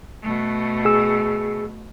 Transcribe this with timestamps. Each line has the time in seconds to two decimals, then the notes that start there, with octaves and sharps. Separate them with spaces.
0.22 B2 A3
0.85 G#4 E6